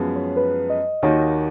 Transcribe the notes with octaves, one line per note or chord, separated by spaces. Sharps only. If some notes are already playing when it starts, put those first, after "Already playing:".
Already playing: F#2 F3 G#3 B3
C#5
B4
D#5
D#2 D#3 A#3 D#4 F#4 C#5